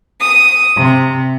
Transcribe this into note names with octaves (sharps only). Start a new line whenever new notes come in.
D#6
C3